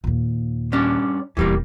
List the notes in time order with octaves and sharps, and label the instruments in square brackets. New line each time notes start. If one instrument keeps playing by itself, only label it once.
[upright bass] D#2 A#2
[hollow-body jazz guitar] G2 C#4 D4
[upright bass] D#1 E2 [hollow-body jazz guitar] E3 G3 A#3